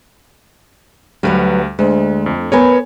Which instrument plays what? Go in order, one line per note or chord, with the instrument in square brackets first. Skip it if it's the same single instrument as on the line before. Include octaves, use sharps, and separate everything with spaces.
[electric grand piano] D2 G3 [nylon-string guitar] F#3 B4 F5
[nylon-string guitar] D2 [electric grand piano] G#3
[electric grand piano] F2
[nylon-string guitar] B3 A#4 B4 [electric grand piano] C#5 G#5